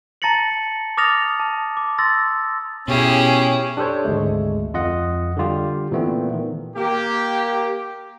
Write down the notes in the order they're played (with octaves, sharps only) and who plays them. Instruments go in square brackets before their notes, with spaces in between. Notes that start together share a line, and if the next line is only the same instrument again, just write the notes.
[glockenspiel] A5 A#5 A6 A#6 C#7 F#7
D6 D#6 F6 A6 A#6 F7
A5
D6
C6 E6 A6 A#6
[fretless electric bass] B2 [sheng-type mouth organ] C#4 [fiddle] E4 G#4 [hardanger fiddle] G4
[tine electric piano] D4 G4 A4 C5 C#5
G#1 D2 G#3 A3
F2 F4 D#5 F#5
D3 G3 F4 G4
A#2 E3 A3 B3 C4
D#3
[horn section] A#3 G4